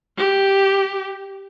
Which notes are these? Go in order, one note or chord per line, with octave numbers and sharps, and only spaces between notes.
G4